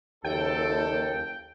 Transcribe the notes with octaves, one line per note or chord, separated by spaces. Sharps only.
F#1 D#2 A4 G5